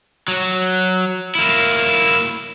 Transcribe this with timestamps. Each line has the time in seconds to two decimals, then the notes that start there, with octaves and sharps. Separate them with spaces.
0.28 F#3
1.35 A#3 E4